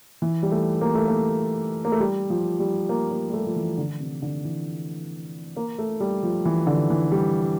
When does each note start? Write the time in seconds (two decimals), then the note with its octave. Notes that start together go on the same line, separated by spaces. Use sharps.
0.22 E3
0.43 G3
0.52 A3
0.81 A#3
0.95 A3
1.08 A#3
1.85 A#3
1.92 A3
2.00 G3
2.30 F3
2.60 G3
2.89 A#3
3.11 A#3
3.29 G3
3.34 A3
3.46 F3
3.56 E3
3.78 D3
4.00 C3
4.22 D3
4.45 E3
5.56 A#3
5.78 A3
6.00 G3
6.23 F3
6.45 E3
6.67 D3
6.90 E3
7.12 G3